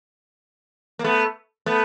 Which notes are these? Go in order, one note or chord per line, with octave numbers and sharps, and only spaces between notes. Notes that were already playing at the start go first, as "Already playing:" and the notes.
A#3
A3 B3
A3 B3